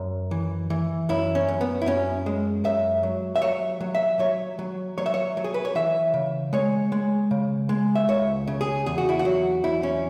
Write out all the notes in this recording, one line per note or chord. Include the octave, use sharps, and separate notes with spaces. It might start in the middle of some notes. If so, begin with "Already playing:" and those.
Already playing: F#2
E3
E3
F#2 E4
C#4
F#2
B3
E4
F#2 C#4
G#3
F#2 E5
F#3
E5
F#3 C#5
F#3
E5
F#3 C#5
F#3
F#3 C#5
E5
C#5
F#3
G#4
B4
C#5
E3 E5
C#3
G#3 C#5
G#3
C#3
G#3
E5
C#2 C#5
C#3
G#4
E2 G#4
F#4
E4
F#4
F#3
E2 E4
C#4